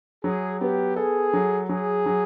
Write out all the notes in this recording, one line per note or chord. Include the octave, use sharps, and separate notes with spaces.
F#3 G#4
B3 G4
G#4 A4
F#3
F#3 G#4
F#3